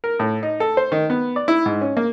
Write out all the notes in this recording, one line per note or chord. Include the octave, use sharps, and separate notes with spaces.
A#4
A2
D#4
A4
C5
D#3
B3
D5
E4
G#2
C#4
A#3